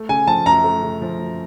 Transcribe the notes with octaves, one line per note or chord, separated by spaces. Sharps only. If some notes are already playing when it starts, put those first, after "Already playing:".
Already playing: A3
C#3 G#5
F3 A5
F#2 A#5
A3
C#3
F3
F#2